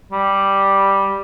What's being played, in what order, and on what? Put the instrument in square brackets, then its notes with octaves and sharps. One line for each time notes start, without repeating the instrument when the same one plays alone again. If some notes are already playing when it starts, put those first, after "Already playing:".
[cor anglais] G3